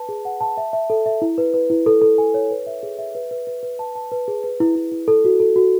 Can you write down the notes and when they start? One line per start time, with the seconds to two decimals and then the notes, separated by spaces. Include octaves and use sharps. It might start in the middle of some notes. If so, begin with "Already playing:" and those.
Already playing: B4 A5
0.09 G#4
0.25 F#5
0.41 A5
0.57 E5
0.73 E5
0.90 A4
1.06 E5
1.22 E4
1.38 B4
1.54 B4
1.70 E4
1.86 A4
2.02 A4
2.18 G#5
2.34 C#5
2.51 B4
2.67 E5
2.83 G#4
2.99 E5
3.15 B4
3.31 B4
3.47 B4
3.63 B4
3.79 A5
3.95 A5
4.12 B4
4.28 G#4
4.44 B4
4.60 E4
4.75 E4
4.92 E4
5.08 A4
5.25 F#4
5.40 A4
5.56 F#4